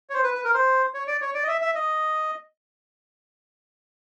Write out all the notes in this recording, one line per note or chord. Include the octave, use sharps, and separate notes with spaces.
C#5
C5
B4
B4
A#4
C5
C#5
D5
C#5
D5
D#5
E5
E5
D#5